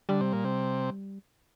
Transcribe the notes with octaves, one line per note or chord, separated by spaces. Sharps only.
D3 G3
C3
A#2
C3